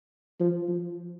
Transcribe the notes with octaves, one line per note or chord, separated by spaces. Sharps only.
F3
F3